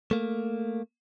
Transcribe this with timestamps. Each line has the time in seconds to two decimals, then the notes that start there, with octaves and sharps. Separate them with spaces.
0.11 A3 A#3